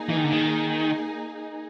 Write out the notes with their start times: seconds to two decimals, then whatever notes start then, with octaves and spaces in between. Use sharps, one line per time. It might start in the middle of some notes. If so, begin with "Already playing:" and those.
Already playing: A#3 D#4 G#4
0.09 E3
0.17 D#3
0.24 D3
0.32 D#3